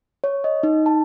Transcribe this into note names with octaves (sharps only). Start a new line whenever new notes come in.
C#5
D#5
D#4
A5